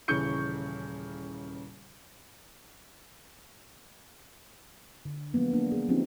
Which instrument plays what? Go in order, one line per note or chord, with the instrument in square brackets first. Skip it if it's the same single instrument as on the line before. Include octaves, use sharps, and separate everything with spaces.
[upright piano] D#1 C#3 E3 C#6 G6 C#7
[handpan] D3
F3 F#3 G#3 A#3 B3
A#3 D4
G#4
F3 C4 C#4 D#4 G4